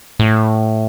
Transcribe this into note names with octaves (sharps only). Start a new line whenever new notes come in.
A2